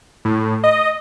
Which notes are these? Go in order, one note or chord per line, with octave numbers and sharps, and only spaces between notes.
A2
D#5